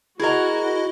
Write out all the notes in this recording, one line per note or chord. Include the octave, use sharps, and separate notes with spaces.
E4 F#4 G#4 A#4 D#5 A#5